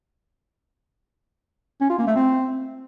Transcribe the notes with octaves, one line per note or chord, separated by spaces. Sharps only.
C#4
F4
A#3
A3
C4